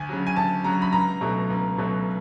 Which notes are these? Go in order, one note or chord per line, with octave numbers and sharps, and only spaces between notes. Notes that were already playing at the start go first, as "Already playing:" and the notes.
Already playing: D2 G#5
C#3 F#3
G#5
D2 A5
C#3 F#3 A#5
B5
C#2 A#5
B2 F#3 A3
C#2
B2 F#3 A3